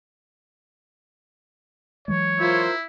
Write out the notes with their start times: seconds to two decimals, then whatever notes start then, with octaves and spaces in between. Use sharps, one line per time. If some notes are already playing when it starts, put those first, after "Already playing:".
2.08 E3 F#3 G#3 C#5
2.40 E4 F4 A#4 C5